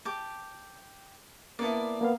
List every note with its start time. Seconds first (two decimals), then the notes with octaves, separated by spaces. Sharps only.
0.05 G4 A5 D6
1.59 A#3 B3 E4 D5 A5
2.01 A#3 B3 F5